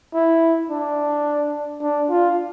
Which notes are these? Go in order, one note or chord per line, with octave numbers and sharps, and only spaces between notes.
E4
D4
D4
F4